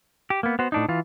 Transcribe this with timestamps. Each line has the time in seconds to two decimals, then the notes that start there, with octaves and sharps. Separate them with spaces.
0.30 G4
0.43 A#3 B3
0.59 B3 F#4 C5
0.72 A2 D4 D#4
0.89 E3 F4